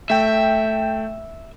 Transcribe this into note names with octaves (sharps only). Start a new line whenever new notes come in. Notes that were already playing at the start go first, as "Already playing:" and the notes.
A3 E5 G5